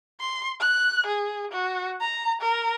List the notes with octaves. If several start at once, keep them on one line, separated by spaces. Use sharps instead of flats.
C6
F#6
G#4
F#4
A#5
A#4